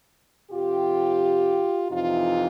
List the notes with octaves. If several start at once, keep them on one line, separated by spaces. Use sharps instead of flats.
F2 C3 F3 F4 G4
F2 C3 E3 D#4 F4